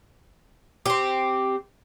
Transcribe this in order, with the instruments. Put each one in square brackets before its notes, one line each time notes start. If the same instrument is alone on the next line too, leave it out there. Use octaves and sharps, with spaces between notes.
[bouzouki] C4 G4